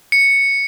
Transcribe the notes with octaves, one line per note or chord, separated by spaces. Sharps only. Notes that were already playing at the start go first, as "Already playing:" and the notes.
C#7